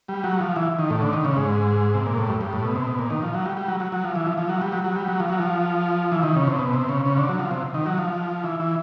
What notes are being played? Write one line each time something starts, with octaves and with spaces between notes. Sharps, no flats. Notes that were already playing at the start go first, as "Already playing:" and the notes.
G3
F#3
F3
E3
D#3
A2
D3
D#3
C#3
G#2
C3
A#2
A2
G2
G2
A2
B2
C3
B2
A#2
D#3
F3
F#3
G3
G3
F#3
F#3
F#3
F3
E3
F3
F3
F#3
G3
F#3
F#3
G3
F#3
F3
F#3
F3
E3
D#3
C#3
C3
B2
C3
C#3
C#3
D3
F#3
F3
C3
D#3
F#3
F3
E3
E3